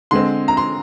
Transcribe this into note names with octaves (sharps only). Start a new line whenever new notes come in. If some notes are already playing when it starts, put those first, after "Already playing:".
D3 G#3 C4 C6
A#5
C6